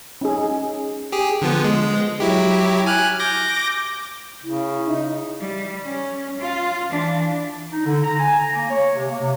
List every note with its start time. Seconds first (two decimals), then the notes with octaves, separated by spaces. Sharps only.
0.21 C#4 D#4 G#4
1.12 G4 G#4
1.41 D3 F3 B3
1.64 G#3
2.20 F#3 E4 G4
2.86 G#5 F6 F#6
3.20 D6 G6 A#6
4.44 C#3 E4
4.87 D#4 E5
5.40 G3
5.85 C#4
6.40 F4
6.90 E3 D4
7.72 D#4
7.86 D3
8.03 A#5
8.19 G#5
8.39 A#5
8.54 A#3
8.70 C#5
8.95 C3
9.09 A#3
9.21 C3